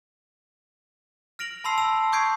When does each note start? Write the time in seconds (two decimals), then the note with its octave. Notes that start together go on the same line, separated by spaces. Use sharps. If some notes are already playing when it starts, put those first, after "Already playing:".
1.39 F6 A#6 D7 F7 F#7
1.64 A5 B5 C6 E6 C7 F7
1.78 A5 E6 F7
2.12 C#6 D#6 G6 G#6 C7 D7